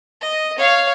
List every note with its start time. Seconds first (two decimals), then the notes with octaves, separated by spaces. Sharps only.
0.21 D#5
0.58 C#5 F5